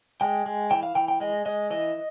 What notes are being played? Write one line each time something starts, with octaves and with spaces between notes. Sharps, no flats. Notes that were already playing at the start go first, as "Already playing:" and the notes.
G#3 G5
G#3
E3 G5
F5
E3 G5
G5
G#3 D#5
G#3 D#5
E3 D#5